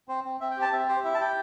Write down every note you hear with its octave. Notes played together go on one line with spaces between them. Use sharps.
C4 C5
C4
C4 E5
G5
G4
A5
C4 E5
G4 C5
E4 E5
A5
G4 G5